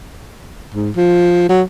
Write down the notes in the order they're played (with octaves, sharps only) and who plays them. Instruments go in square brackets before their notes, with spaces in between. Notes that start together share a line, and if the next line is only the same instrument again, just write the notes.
[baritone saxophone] G#2
F3
F#3